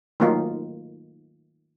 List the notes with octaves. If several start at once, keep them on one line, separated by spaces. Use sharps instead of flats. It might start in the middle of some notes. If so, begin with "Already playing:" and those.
D#3 F#3 A3 A#3 D#4 F4